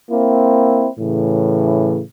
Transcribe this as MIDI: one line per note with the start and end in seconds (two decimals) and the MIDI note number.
0.11 0.88 58
0.11 0.88 60
0.11 0.88 64
0.99 2.00 45
0.99 2.00 49
0.99 2.00 52